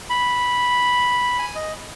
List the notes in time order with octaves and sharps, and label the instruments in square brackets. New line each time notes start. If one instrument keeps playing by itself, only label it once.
[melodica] B5
G#5
D#5